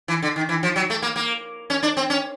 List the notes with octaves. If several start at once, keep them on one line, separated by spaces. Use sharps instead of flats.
E3
D3
D#3
E3
F3
F#3
A3
A#3
A#3
C#4
D4
C4
C#4